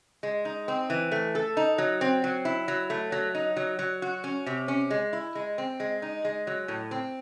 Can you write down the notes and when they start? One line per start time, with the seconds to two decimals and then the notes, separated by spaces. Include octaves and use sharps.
0.23 G#3
0.45 D#4
0.68 C4
0.90 E3
1.11 A3
1.35 A4
1.57 D#4
1.78 F#3
2.01 C4
2.24 F#3
2.45 E4
2.68 F#3
2.90 A3
3.12 F#3
3.35 D#4
3.56 F#3
3.79 F#3
4.02 F#4
4.24 C#4
4.46 C3
4.68 C#4
4.90 G#3
5.13 E4
5.35 G#3
5.58 C4
5.80 G#3
6.02 D#4
6.25 G#3
6.47 F#3
6.68 A2
6.91 C4